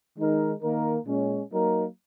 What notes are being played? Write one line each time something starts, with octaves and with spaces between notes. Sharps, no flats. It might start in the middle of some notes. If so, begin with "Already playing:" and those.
D#3 G#3 D#4 A#4
D#3 A#3 D#4 A#4
A#2 G#3 C#4
F#3 A#3 D#4 A#4